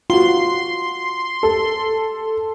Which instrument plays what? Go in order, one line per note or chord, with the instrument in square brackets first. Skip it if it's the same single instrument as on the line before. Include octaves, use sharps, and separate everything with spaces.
[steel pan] F4 F#4 [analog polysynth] C6
[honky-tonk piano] A4